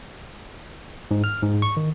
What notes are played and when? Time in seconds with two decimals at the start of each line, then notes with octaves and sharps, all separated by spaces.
1.11 G#2
1.24 F6
1.42 G#2
1.62 C#6
1.77 D#3